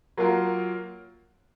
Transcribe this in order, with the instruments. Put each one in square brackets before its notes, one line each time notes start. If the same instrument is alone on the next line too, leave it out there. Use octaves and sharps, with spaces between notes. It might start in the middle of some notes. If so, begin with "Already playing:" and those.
[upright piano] F#3 A#3 F4 A#4